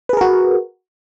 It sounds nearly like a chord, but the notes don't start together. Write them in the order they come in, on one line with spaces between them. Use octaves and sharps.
B4 G#4 A#4 F#4